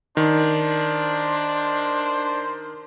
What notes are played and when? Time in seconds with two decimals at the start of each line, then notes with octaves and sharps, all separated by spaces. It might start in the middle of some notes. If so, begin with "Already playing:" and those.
0.17 D#3 D4 C5